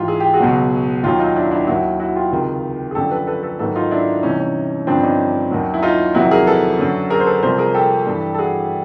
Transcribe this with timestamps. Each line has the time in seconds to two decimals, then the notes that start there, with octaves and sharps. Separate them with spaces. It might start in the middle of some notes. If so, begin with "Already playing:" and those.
Already playing: G#2 E3 F4 G4
0.08 G#4
0.20 G4
0.34 F#4 G#4
0.40 C#2 B2 F#3
1.04 D#2 D#3 F#3 F4 G4
1.20 D#4 F4
1.36 D4 E4
1.51 D4 E4
1.67 D#2 D#3 F#3 E4 F#4
2.00 E4 F#4
2.16 F4 G4
2.32 C#2 C3 D#3
2.91 G#4
2.95 F#2 D3 F3 G4 A4
3.11 A4 B4
3.27 A4 B4
3.43 A4 B4
3.59 G#2 D#3 F#3 A4 B4
3.76 D#4 F4
3.91 D4 E4
4.23 C2 C3 E3 C#4 D#4
4.39 C#4
4.87 G2 D3 F3 C4 D4
5.03 C#4 D#4
5.51 D#2 D#3 F#3
5.74 E4
5.82 D#4 F4
6.15 F2 C3 D#3 F#3 E4 F#4
6.31 G#4 A#4
6.47 A4 B4
6.79 F#2 D3 F#3
7.10 G#4 A#4
7.20 C5
7.26 A4 B4
7.43 C2 C3 F3 A#4 C5
7.58 G#4 A#4
7.74 G4 A4
8.06 G2 E3
8.35 A4
8.39 F#4 G#4